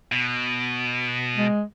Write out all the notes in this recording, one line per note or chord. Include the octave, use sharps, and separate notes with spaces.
B2
G#3